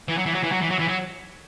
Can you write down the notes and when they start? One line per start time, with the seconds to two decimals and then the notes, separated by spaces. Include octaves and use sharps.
0.08 E3
0.17 F#3
0.26 E3
0.34 F#3
0.43 E3
0.52 F#3
0.61 E3
0.70 F#3
0.79 E3
0.88 F#3